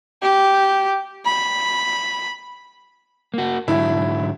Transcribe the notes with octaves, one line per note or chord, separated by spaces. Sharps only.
G4
B5
A#3 F#4
G#2 D3 F#3 E4